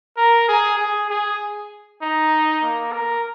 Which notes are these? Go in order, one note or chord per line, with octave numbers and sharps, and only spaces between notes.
A#4
G#4
G#4
G#4
D#4
A#3
A#4